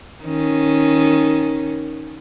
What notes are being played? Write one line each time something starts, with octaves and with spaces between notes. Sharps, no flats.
D#3 C#4